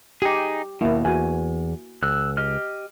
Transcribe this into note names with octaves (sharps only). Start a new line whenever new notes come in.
D#4 G4 G#4
D#2 B2 A#3 E4
E2 F#4 G#5
C#2 E6 F#6
G4 D#5 F6